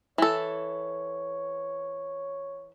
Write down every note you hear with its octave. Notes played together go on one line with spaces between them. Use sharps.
E3 A4 C#5